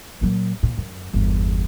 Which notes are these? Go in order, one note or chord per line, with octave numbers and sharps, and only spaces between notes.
A#2 F#3
A#2
F#2
G1 E2